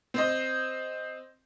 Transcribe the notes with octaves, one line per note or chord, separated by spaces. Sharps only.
C4 C5 D#5